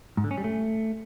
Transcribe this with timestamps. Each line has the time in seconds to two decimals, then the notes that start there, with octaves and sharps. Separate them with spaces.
0.17 G#2
0.24 D3
0.31 C#4
0.38 G3
0.44 A3